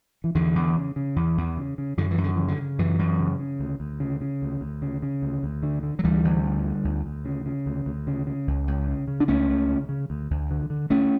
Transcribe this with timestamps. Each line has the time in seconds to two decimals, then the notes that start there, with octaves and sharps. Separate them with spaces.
0.24 E3
0.35 E2 D3
0.55 E2
0.77 C#3
0.96 C#3
1.16 E2
1.37 E2
1.57 C#3
1.78 C#3
1.97 F#2 D3
2.11 E3
2.18 F#2
2.23 D3
2.36 C#3 E3
2.48 D3
2.58 C#3
2.79 F#2 E3
2.99 F#2
3.19 C#3
3.39 C#3
3.60 D2
3.80 D2
4.00 C#3
4.21 C#3
4.42 D2
4.61 D2
4.82 C#3
5.02 C#3
5.22 D2
5.43 D2
5.63 D3
5.83 D3
5.99 F#3
6.04 D2 E3 G3
6.24 D2
6.44 D3
6.64 D3
6.84 D2
7.06 D2
7.25 C#3
7.46 C#3
7.66 D2
7.86 D2
8.07 C#3
8.27 C#3
8.47 C#2
8.68 C#2
8.88 C#3
9.08 C#3
9.20 D4
9.28 C#2 A3 C#4
9.49 C#2
9.68 C#3
9.89 C#3
10.10 D2
10.31 D2
10.51 D3
10.70 D3
10.90 D2 A3 C#4